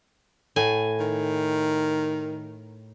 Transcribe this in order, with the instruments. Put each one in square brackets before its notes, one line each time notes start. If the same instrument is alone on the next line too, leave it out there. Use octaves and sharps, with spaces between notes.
[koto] A2 G#5
[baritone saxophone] D#3